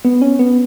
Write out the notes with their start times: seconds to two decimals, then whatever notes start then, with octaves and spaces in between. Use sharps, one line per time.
0.05 B3
0.22 C#4
0.39 B3